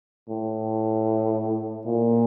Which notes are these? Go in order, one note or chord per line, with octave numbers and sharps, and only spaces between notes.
A2
A#2